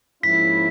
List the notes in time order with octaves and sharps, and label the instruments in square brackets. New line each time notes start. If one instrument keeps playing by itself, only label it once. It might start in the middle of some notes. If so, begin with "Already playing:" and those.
[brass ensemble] G#2 F3 A#3 C#4 E4 [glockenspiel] B6